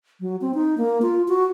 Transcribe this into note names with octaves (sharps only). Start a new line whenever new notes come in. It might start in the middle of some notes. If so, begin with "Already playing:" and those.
F#3
C4
D#4
A#3
F4
F#4